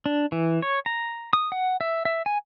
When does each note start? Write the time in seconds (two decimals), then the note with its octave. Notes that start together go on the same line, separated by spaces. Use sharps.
0.06 D4
0.32 E3
0.62 C#5
0.86 A#5
1.33 D#6
1.52 F#5
1.81 E5
2.05 E5
2.26 G#5